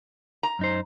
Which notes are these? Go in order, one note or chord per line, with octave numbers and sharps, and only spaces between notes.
A#5
F#2 D#4 C5